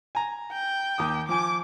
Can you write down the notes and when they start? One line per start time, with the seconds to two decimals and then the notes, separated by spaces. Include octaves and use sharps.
0.15 G#5 A#5
0.52 G5
0.98 D#2 D6 D#6
1.29 F3 G#5 D6